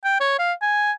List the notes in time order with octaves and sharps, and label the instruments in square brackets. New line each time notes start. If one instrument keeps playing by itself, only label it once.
[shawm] G5
C#5
F5
G#5